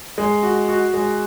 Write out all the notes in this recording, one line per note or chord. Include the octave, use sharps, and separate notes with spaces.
G#3
F#4
F#4
G#3